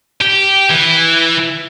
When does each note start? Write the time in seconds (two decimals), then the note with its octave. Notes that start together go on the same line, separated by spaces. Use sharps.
0.21 G4
0.71 E3